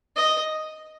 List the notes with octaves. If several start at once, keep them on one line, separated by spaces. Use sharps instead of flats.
D#5